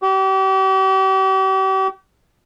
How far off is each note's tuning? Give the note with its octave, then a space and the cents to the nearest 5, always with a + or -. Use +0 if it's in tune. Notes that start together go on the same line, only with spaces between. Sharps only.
G4 -40